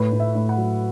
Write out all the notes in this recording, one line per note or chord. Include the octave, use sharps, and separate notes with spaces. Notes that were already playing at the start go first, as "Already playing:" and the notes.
Already playing: A2 B4
A2
E5
A2
F#5
F#3